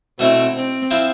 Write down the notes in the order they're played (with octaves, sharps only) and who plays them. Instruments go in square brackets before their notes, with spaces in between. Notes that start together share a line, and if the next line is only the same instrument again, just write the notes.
[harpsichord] B2 A3 E4 [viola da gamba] C4
[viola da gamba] C4
[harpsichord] F3 C4 E4